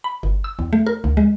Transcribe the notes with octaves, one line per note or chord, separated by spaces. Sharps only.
B5
G1
E6
E2
A3
A#4
D2
G#3